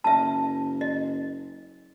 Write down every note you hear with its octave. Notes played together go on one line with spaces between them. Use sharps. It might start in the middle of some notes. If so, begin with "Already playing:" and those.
F#1 E5 A5
D#5